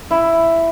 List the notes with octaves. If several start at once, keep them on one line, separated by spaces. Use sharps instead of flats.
E4